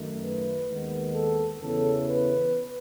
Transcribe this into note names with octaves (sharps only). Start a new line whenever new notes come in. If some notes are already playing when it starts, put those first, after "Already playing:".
Already playing: F#2 D#3 A3
B4
D#2 D#3 G#3 B3
A4
E2 C#3 E3 B3 A4
B4